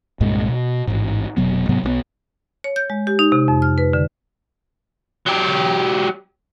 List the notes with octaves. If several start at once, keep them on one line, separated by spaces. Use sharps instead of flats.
C2 G2 A#2 G#3
B2
A1 G#2
F1 B2 F#3 B3
G#2 C3 F#3 B3
B1 G3 B3
C#5
G6
G#3
G4
D#4
C3
F2
F6
B4
D3
F#3 G4